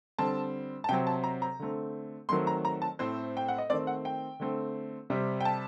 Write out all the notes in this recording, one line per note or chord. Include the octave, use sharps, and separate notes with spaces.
D3 G3 C4 A5
A5
C3 F#3 C4 G5
A5
A#5
A#5
D3 A3 C4
D#3 F#3 A3 C4 C6
A#5
A#5
A5
A2 A3 C4 C5
G5
F#5
D#5
D#3 A3 C4 D5
F#5
G5
D3 A3 C4
C3 G3 C4
G5
A5